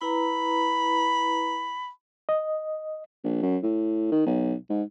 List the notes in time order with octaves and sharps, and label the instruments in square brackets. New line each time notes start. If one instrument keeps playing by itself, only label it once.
[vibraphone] E4 B4 A#5 [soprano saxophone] B5
[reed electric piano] D#5
[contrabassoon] A#1
F#2
A2
D#3
B1
G#2